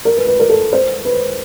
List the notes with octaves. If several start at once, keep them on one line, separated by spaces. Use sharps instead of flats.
A#4
B4
B4
A#4
A4
C5
B4